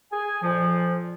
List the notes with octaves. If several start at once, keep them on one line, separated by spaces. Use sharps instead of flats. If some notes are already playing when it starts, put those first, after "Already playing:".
G#4 G#5
F2 A#2 F3